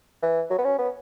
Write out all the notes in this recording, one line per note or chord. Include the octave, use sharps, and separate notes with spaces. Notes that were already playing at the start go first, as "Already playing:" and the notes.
E3
F#3
B3
C#4
B3